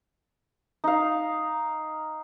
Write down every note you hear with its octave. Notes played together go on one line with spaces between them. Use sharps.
D#4 F5